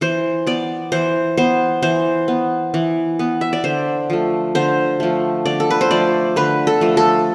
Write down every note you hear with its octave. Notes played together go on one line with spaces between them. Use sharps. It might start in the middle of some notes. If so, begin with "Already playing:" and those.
E3 C5
B3 D5
E3 C5
B3 C5
E3 C5
B3
E3
B3
E5
D5
D3 C5
F3 A3
D3 C5
F3 A3
D3 D5
A4
B4
C5
F3 A3 D5
D3 B4
A4
F3 A3
A4